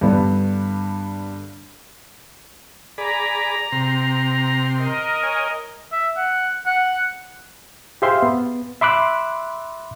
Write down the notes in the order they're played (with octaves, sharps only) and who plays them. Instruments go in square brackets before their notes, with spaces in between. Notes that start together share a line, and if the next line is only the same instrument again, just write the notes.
[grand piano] G2 D3 B3 D4
[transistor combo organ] G#4 D5 B5 [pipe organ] A#5
[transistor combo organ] C3 C6
[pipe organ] A#4 D#5
[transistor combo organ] C#5 G#5
[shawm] E5
F#5
F#5
[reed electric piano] G4 G#4 C5 E5 F5 C6
B3
E5 B5 C6 D6 E6 F#6